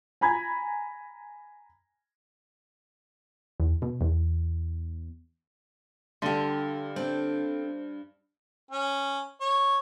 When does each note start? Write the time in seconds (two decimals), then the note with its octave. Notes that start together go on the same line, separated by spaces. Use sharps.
0.21 G#5 A#5 B5 G#6
3.60 E2
3.82 B2
4.01 E2
6.22 G2 D3 G4 A4 C6
6.96 C4 D4 A4 C5
8.71 C#4
9.41 C#5